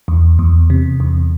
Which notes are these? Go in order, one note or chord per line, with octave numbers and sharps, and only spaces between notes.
E2
E2
C3
E2